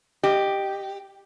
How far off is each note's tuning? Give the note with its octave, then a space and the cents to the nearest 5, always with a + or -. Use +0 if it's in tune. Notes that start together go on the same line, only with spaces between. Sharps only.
G4 +0 D#5 -15